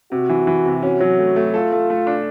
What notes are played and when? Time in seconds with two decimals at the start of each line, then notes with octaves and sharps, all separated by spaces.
0.12 C3 F#4
0.29 E3
0.47 E3
0.65 C3
0.83 C#4 F#4
1.00 F#3
1.18 A3
1.36 A3
1.54 F4 A4
1.72 A3
1.90 A3
2.07 D4